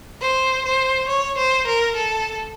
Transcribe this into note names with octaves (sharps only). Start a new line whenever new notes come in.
C5
C5
C#5
C5
A#4
A4